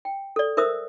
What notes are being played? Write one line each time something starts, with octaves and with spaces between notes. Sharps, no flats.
G5
A4 D5
A#4 C5 E5 D#6 E6